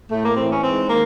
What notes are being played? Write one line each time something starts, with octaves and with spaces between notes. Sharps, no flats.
A2 A3
A#3
E3 C4
C#4
G#2 C4
D#3 A#3